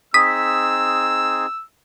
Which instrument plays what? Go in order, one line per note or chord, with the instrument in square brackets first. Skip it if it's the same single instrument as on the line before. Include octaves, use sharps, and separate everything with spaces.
[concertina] C4 D#4 G#4 [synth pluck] D#6 B6 [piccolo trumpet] E6